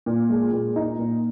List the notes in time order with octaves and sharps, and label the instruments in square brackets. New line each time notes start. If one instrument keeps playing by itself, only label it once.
[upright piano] A#2
G#3
A#2
D#4
A#2